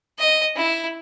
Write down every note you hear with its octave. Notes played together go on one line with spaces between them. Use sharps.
D#5
E4